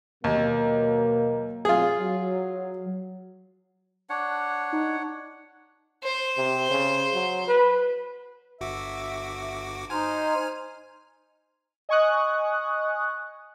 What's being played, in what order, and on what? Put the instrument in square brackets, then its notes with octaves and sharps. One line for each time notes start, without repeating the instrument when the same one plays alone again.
[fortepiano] D#2 [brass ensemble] B2 F#3 A#3
[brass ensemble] F#3 [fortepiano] F4 G#4
[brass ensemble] F#3
[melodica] D4 C#5 F#5
[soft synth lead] D#4
[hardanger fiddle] C5
[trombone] C3
C#3
F#3
B4
[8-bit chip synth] G1 F#4 D6 [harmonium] E5
[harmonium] D#4 C5 [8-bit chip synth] G#5 F6
[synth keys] D#5 G#5 C#6 D#6 F#6